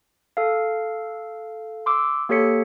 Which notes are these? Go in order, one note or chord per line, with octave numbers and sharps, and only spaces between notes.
A4 F5
C6 D6 E6
A#3 G4 A4 C#5 B6 C#7